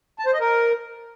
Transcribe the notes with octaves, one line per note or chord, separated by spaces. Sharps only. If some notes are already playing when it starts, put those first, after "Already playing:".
A5
C5
D#5
A#4